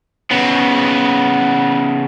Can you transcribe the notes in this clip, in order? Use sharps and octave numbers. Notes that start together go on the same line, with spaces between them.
C#3 B3